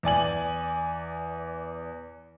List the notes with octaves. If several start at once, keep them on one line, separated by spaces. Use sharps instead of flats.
E2 D5 G#5 F#7